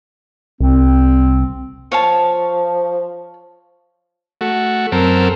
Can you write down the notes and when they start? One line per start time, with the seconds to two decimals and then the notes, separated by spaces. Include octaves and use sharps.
0.60 C2 C4
1.92 F3 C#5 F5 A5
4.41 A3 F#4
4.92 F#2 C4 A4 A#4